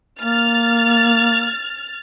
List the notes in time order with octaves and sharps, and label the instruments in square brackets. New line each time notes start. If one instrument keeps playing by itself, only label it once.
[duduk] A#3 [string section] F6 A6